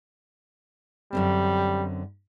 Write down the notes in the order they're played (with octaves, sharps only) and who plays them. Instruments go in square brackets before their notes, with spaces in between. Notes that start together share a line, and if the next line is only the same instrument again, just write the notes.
[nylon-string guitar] F#2 D3 C4 [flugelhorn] G3